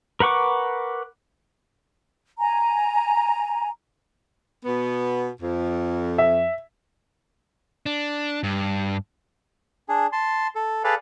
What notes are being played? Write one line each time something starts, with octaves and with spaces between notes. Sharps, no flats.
A#4 B4 F#5 C#6 D6
G#5 A#5
B2 B3
F2
E5
D4
G2
D4 G#4
A5 C6
A4
G#4 A4 B4 D5 F5